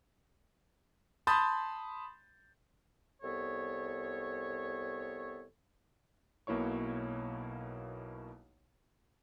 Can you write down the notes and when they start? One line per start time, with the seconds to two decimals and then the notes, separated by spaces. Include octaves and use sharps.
1.27 A5 B5 C6 D#6 G6 A6
3.22 C2 B3 A4 C#5
6.47 B1 B2 A#3 E4 C#5 C#6